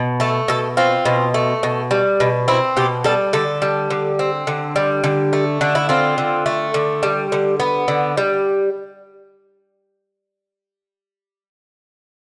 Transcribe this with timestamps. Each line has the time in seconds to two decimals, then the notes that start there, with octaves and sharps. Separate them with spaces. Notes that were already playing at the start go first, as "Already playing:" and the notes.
Already playing: B2
0.20 A3 A4
0.48 B2 A4
0.77 C4 F4
1.05 B2
1.34 A3
1.63 B2
1.91 G3
2.20 B2
2.48 C4 E4
2.77 B2 G4
3.04 G3 A4
3.33 D3 A4
3.62 G3
3.90 D3
4.19 C4
4.47 D3
4.76 G3
5.04 D3
5.33 A3
5.61 D3 D4
5.75 E4
5.89 C4 F4
6.18 D3
6.46 A3
6.74 D3
7.03 G3
7.32 D3
7.60 B3
7.88 D3
8.17 G3